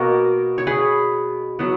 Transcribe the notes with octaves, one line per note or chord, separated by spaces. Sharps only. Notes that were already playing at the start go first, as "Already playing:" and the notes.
Already playing: B2 A#3 F#4 A#4
C#5
G#4 B4
F#3 B3